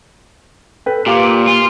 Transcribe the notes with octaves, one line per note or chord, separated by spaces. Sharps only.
A4 B4 G5
A#2 G4 F5 D6
F4